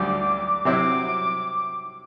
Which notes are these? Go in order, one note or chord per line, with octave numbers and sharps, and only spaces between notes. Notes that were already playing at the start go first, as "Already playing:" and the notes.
Already playing: D2 D3 G3 D4 D6
C3 F#3 C4 E4 D6